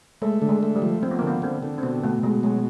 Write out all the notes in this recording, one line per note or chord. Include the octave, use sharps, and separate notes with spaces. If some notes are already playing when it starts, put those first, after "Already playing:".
G#3 A3
D3
G#3
A3
G3
F3
F3 C4
B3
A#3
D3 B3
D3 C4
D3
C4
B2 B3
B2 A3
B2 G#3
F#3 G#3